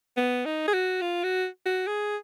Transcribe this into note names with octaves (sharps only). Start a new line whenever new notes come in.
B3
D#4
G#4
F#4
F4
F#4
F#4
G#4